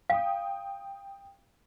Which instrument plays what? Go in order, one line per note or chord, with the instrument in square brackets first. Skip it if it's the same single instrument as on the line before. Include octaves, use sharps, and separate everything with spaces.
[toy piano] F5 [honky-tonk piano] G5 D#6